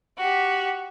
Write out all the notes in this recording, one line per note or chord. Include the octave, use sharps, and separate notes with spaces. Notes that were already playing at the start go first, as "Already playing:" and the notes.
F#4 G4